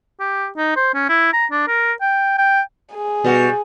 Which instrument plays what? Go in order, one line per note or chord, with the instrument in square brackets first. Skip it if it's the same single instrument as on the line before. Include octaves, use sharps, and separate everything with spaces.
[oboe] G4
D#4
C5
C#4
E4
A#5
D4
A#4
G5
G5
[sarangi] G#4
[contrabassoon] B2 [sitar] G3 F#4